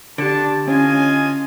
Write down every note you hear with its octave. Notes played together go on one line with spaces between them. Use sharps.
D3 D4 G4 A5 D7
C#4 E4 F4 C#5 D#5 G#5